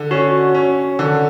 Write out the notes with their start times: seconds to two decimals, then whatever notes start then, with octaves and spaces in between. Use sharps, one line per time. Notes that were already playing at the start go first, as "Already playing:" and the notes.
Already playing: D3
0.11 C#4 F#4
0.55 C#4
0.99 D3